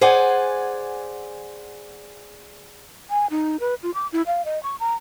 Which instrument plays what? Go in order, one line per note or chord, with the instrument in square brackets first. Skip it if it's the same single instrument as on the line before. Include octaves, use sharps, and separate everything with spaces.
[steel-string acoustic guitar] G#4 C5 D5 F#5 G#5
[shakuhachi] G#5
D#4
B4
F4
D6
E4
F5
D#5
C#6
A#5